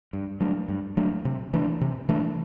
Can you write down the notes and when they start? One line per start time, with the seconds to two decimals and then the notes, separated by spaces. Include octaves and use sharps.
0.13 G2
0.40 F#3 A3 D4
0.68 G2
0.97 F#3 A3 D4
1.25 C3
1.53 E3 A3 D4
1.81 C3
2.09 E3 A3 D4